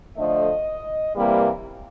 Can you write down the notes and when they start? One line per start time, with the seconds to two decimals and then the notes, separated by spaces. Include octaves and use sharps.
0.17 D3 F3 A3 D#5
1.15 C3 E3 G3 A#3